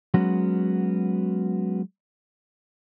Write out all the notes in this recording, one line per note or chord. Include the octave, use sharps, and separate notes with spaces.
F#3 G#3 B3 C#4 F#4